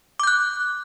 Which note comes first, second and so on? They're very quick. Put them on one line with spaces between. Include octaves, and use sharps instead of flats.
D6 G6 F#6